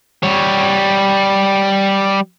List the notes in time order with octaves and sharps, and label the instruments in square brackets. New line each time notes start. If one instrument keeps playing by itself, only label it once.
[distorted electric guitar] G3 C#5